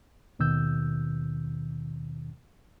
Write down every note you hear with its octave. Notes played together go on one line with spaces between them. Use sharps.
D#2 B2 D#3 E6 G6